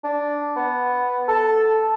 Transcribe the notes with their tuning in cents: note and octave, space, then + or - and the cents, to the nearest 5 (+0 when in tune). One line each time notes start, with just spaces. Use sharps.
D4 -5
B3 +0
A4 +0